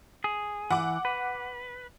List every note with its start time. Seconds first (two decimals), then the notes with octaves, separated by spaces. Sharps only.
0.24 G#4
0.71 E3 F#5 D6
1.05 B4